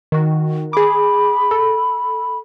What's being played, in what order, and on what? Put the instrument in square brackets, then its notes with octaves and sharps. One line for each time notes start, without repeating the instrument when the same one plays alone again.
[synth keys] D#3 F#4
[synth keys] G#4 D6 [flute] B5
[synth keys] A4